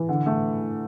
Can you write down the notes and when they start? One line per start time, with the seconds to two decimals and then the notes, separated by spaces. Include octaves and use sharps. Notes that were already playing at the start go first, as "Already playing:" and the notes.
Already playing: E3
0.09 D3
0.26 A3